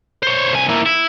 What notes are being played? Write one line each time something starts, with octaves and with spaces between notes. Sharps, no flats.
C5 C#5
C2 G#5
A#3 E4
E4